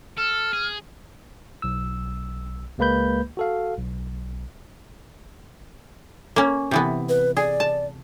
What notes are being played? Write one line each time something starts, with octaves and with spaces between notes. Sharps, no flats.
A4 F6
G#4
B1 E6
C#2 G#3 A#3 B4 B5 G6
F#4 A4 F5
B1
A#3 C#4
C3 E3 B3
B4
G#4 D5
A5